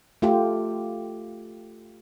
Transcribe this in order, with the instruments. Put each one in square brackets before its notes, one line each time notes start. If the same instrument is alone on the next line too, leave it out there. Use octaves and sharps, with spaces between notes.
[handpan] A3 F4 G4